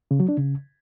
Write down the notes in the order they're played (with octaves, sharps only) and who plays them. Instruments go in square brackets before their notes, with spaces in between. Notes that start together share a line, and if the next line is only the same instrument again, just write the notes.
[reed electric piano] C#3
F#3
D4
C#3